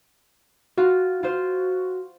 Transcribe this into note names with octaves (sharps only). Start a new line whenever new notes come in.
F4 F#4
F4 C5